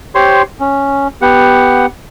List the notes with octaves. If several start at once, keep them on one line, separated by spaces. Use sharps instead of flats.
G4 C5 C#5 C6
C#4
B3 G4 F#5